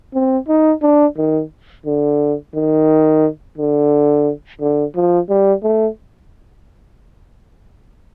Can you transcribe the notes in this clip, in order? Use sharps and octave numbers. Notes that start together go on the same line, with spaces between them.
C4
D#4
D4
D#3
D3
D#3
D3
D3
F3
G3
A3